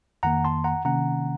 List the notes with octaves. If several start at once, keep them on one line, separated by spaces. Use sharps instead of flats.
F2 D#3 A#3 F#5 A#5
A5 C6
F#5 A#5
C3 D#3 A#3 C#4 F#5 A#5